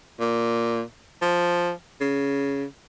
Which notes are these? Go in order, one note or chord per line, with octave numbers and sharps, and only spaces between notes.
A#2
F3
C#3